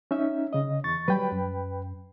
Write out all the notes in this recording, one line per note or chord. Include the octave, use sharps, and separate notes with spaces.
C#4 D#4 E5
C#3 D#5
E2 C#6 A6
F#3 G3 B4 G5 B5
F#2